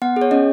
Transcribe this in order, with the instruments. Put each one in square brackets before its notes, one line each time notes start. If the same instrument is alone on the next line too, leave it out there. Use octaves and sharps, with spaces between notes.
[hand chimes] B3 F#5
G#4
C#5
C#4 D#5